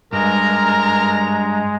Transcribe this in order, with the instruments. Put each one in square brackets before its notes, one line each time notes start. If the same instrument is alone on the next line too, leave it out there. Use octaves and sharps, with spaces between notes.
[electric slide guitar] G2 [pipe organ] G#3 [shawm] A#4 [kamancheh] A#5